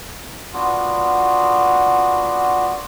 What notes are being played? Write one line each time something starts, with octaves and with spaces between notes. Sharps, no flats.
B3 D4 F4 F#4